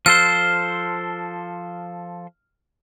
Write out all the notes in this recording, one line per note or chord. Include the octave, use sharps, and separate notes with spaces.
F3 A4 C5 F6